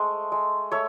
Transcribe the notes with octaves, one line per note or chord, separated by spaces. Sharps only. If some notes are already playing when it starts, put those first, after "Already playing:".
Already playing: G#3 A3 C5
G#3
A3 C#5 E5